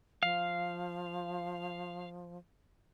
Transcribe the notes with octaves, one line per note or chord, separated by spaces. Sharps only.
F3 F5